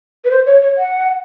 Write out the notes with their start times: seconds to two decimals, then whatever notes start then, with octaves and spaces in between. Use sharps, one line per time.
0.25 B4
0.31 C5
0.46 C#5
0.62 C#5
0.78 F#5